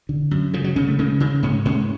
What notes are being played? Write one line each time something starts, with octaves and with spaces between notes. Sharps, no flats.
D3
F#2
C#3 F3
F#3
C#3 C#4
A3
C#3 G#3
C#3
G#2 C#4
G#2 C#4